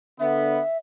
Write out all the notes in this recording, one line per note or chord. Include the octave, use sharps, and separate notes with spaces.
D3 B3 E5